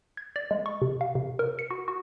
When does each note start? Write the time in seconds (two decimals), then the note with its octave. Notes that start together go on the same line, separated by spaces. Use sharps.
0.17 G#6
0.36 D5
0.51 G#3
0.66 C#6
0.82 C3
1.01 F5
1.15 C3
1.39 A#4
1.59 C#7
1.71 F#4
1.88 F#4